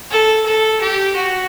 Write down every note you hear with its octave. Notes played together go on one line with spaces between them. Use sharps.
A4
A4
G4
F#4